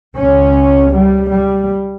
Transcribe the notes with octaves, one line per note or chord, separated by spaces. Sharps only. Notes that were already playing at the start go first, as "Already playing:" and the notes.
C#2 C#3 C#4
G3
G3